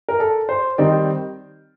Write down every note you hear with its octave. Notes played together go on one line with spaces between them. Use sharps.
A#4
A4
C5
D#3 G3 C4 D#4 D5